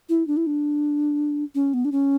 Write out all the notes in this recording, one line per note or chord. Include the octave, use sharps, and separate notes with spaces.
E4
D4
E4
D4
C#4
B3
D4
C#4